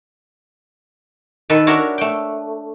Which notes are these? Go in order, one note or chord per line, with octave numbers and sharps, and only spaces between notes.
D#3 A4 B4
D4 F#4 A#4 C#5 E5
A3 G5